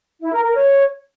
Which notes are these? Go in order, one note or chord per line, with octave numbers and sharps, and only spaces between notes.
E4
A#4
A#4
C#5